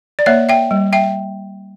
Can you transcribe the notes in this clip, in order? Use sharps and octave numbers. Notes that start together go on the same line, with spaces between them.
D5
A#3 C#5 E5
E5 G5
G3
E5 G5